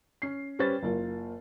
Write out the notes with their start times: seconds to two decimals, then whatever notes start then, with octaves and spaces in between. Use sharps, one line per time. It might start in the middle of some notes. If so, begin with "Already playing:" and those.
0.22 C#4 C7
0.59 G3 C#4 G4 B4 C5 A6
0.83 F#1 A#3 F4